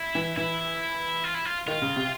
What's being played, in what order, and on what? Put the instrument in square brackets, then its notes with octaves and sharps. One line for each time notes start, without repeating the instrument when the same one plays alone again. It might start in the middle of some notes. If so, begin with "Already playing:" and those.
Already playing: [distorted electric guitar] E4
[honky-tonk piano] E3
[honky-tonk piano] E3 [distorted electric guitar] E4
[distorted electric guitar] F4
E4
F4
[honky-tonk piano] D#3 [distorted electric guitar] F4
[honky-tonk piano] C#3
C3